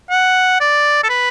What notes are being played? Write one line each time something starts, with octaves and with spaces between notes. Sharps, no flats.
F#5
D5
A4
B4